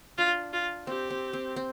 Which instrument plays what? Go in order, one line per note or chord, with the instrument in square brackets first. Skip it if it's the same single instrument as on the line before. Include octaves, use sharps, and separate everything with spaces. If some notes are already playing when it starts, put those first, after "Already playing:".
[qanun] D4 [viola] F4
[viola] F4
[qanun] C4 [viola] G4
[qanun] C4
C4
C4